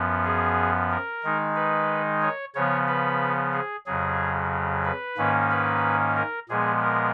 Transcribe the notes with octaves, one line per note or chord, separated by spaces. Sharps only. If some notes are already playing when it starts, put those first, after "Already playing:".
Already playing: F#2 F3 B3
G#4
A#4
D#3 G#3 D#4
B4
C#5
C#3 F3 B3 C#5
B4
G#4
F2 C#3 F#3 G#4
B4
G#2 D#3 A#3 C#4
B4
A#4
A#2 F3 G#3 B3 G#4
A#4